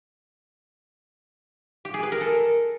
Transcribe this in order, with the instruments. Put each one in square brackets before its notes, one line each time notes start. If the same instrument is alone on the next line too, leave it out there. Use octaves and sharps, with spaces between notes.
[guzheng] G4
G#4
B4
A#4
A4